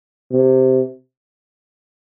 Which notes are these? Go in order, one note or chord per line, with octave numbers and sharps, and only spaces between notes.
C3